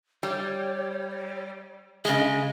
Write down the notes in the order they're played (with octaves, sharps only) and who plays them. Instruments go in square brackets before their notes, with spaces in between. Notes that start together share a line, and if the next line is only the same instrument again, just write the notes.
[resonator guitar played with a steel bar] G3 [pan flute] C#5
[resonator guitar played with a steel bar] C#3 G#3 [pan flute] D#5